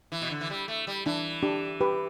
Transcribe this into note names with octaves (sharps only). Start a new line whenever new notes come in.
E3
B2
D3
E3
G3
A3
G3
E3 D4
D4 G4
G4 B4